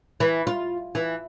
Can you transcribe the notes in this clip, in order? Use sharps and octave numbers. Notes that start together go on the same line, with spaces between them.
E3
F4
E3